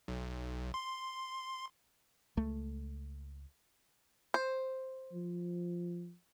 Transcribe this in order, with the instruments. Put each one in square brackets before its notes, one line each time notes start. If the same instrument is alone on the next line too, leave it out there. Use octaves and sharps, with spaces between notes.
[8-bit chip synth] B1
C6
[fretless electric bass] C#2 A3
[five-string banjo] C5
[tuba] F3